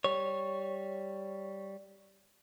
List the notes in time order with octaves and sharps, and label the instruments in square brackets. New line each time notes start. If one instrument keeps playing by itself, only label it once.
[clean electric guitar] G3 C#5